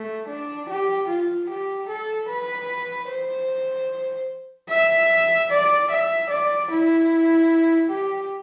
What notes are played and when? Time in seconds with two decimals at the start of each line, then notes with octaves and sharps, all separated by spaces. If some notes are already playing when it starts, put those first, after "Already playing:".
Already playing: A3
0.28 D4
0.69 G4
1.08 F4
1.49 G4
1.89 A4
2.29 B4
3.09 C5
4.69 E5
5.51 D5
5.90 E5
6.30 D5
6.71 E4
7.90 G4